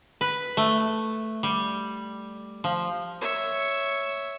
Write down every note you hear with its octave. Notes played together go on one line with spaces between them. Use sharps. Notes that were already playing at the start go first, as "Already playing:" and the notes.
B4
A3
G3
F3
C#5 E5